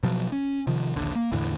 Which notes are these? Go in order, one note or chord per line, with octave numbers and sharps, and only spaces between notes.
B2 F3 F#3
C#4
C3 D#3 F3
A#1 D#2 D3
A#3
E2 A2 D3 E3